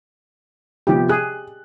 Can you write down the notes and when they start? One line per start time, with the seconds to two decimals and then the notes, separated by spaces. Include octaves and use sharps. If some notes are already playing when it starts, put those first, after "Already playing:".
0.87 C3 F3 B3 G4
1.09 G#4 F#6